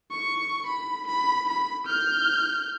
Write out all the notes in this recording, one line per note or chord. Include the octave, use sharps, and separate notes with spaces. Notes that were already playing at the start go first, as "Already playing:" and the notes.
C#6
B5
B5
B5
F6 G6